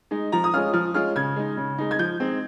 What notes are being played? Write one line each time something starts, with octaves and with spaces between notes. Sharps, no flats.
G#3 D#4
F3 A#5
D#6
G#3 C#4 F4 F6
F3 F6
G#3 C#4 F4 F6
C#3 G#6
G#3 D#4
C#3
G#3 D#4
G#6
F3 G6
G#3 C4 D#4